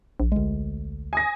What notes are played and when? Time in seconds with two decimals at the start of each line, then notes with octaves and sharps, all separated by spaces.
0.20 A#1
0.32 D2 G#3
1.13 G#5 D#6 A#6